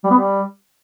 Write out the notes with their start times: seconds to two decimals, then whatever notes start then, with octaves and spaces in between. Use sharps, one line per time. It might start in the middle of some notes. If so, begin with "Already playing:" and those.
0.04 G3
0.11 B3
0.17 G3